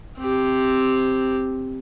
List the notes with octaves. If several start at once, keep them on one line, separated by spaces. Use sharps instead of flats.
C4 G4